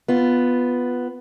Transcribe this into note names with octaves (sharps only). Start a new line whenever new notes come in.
B3 F4